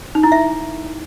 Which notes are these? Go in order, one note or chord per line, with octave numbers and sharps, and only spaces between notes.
D#4
E4
E5